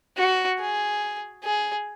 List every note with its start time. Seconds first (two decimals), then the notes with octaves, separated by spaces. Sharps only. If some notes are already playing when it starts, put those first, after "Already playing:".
0.17 F#4
0.59 G#4
1.44 G#4